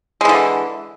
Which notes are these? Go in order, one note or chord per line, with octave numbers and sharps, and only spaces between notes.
D3 E3 G#3